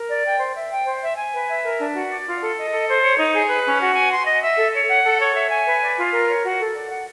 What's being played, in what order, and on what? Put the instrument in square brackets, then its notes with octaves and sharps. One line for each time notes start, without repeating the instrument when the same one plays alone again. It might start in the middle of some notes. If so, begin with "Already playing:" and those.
Already playing: [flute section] A#4
D5
G5
C5
E5
G5
C5
E5
G#5
B4
E5
A#4
D4
F#4
D5
F4
A4
D#5
A4
C5
C#5
D#4
G#4
B4
C#4
F#4
G#5
C6
D#5
E5
A4
C#5
F#5
A4
C#5
E5
G#5
B4
D5
F4
A#4
C#5
F#4
A4
D5
F#5